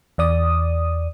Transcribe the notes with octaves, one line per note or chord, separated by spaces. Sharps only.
E2 D5 D#6